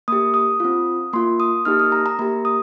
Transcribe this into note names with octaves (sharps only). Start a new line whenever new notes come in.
A#3 G4 D#6
D#6
C4 F4
A#3 F4 C6
D#6
A#3 D#4 G4 F6
D#6
A#5
A#5
A#3 G4 A#5
D#6